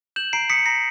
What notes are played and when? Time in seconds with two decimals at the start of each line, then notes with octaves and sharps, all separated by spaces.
0.16 G6 E7 F#7
0.33 A#5 C7 D7
0.50 D#6 B6 C#7
0.66 A#5 A#6 C7